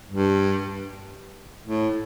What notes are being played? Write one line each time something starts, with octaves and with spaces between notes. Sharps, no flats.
G2
A2